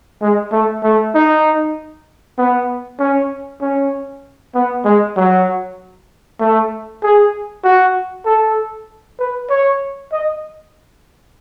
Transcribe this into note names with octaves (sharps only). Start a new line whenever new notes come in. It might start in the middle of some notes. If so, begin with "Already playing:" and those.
G#3
A3
A3
D#4
B3
C#4
C#4
B3
G#3
F#3
A3
G#4
F#4
A4
B4
C#5
D#5